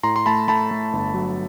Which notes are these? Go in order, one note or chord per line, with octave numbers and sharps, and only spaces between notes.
A2 A#5 C6
C6
A3 A5 B5
A3 A5 B5
A3
G1
F#3